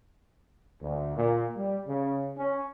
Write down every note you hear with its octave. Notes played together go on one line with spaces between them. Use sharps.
D2
A#2
G3
C#3
C#4